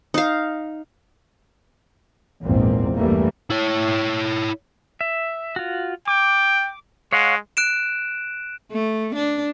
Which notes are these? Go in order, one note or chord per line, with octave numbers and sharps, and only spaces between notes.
D#4 F5
A#1 E2 G#2 A#3 C4
E2 G2 E3 G3 A3 A#3
E4 C#5
E5
F4 F#4
G5 D6
G#3 C#5 F5 F#5
F#6 D7 E7
A3
D4